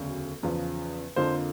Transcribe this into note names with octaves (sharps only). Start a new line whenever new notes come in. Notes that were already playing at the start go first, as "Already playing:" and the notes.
Already playing: E1 D2 C#3 F#3
E2 C#3 F3
F2 D3 F3 A#3 C5